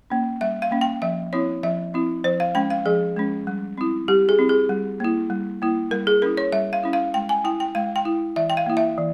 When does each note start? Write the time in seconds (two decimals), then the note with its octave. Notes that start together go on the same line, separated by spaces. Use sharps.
0.10 A#3 C#4
0.41 G3 E5
0.62 F5
0.71 A#3 C#4
0.81 G5
1.02 F3 E5
1.33 C4 E4 C#5
1.63 F3 E5
1.94 C4 E4
2.24 F3 C5
2.40 F5
2.55 G#3 C#4 G5
2.70 F5
2.86 F3 G#4
3.17 G#3 C#4
3.47 G3
3.78 C4 E4
4.08 G3 G4
4.29 G#4
4.39 C4 E4
4.49 G#4
4.69 G3
5.00 A#3 E4
5.30 G3
5.62 A#3 E4
5.91 G3 A#4
6.07 G#4
6.22 C#4 E4 A#4
6.37 C#5
6.52 G3 E5
6.73 F5
6.84 C#4 E4
6.93 F5
7.14 G#3 G5
7.29 G#5
7.45 E4 G5
7.60 G5
7.75 G#3 F5
7.96 G5
8.05 E4
8.36 E3 E5
8.50 G5
8.57 F5
8.66 A#3 E4
8.77 E5
8.98 E3